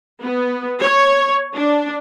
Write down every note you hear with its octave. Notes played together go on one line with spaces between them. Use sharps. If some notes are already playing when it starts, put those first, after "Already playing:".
B3
C#5
D4